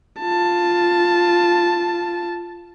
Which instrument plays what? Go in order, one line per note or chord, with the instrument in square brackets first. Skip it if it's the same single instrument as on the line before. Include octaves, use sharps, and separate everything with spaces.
[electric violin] F4 A5